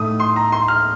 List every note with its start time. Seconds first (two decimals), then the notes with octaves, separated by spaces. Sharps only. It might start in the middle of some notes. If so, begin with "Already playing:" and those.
Already playing: A2 A3 D#4 D#6
0.20 C6
0.36 A#5
0.52 C6
0.68 F6